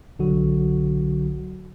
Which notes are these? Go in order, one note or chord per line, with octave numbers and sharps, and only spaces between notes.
B1 D3 F#3 F#4